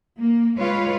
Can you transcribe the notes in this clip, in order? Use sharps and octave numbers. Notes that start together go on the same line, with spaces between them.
A#3
G#3 F4 B4 C#5 F5